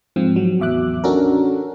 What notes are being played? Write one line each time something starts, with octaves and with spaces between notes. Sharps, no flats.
G#2 F3 C4
F#3
A1 E2 E5 D6 F#6
C#4 D4 F#4 A4 A#4